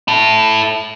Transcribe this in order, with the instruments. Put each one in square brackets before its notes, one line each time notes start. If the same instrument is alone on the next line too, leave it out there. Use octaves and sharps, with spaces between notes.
[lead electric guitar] E4 A4